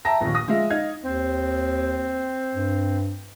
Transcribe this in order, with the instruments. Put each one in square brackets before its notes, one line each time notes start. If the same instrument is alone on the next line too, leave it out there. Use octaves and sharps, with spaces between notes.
[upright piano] E5 G5 A5 A#5 A#6
A#1 D#2
D#6 A#6
F3 G#3 E5 F5
D#4 F5 G#6
[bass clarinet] D#2 [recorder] C4
[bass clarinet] G2